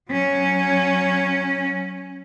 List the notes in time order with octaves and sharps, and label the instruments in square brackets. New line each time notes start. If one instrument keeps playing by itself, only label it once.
[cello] F#3 C#4